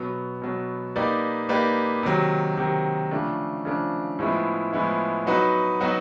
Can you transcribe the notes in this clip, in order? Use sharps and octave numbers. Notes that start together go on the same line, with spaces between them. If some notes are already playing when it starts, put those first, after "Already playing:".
Already playing: B2 F#3 B3
B2 F#3 B3
A#3 D#4 G4 B4 D5
A#3 D#4 G4 B4 D5
C3 D#3 F#3
C3 D#3 F#3
C#3 F3 A3 D4
C#3 F3 A3 D4
A2 F3 G#3 B3 E4
A2 F3 G#3 B3 E4
F#3 B3 D#4 F#4 B4
F#3 B3 D#4 F#4 B4